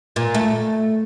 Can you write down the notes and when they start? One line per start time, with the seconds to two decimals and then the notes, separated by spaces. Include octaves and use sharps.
0.16 A#2
0.34 A3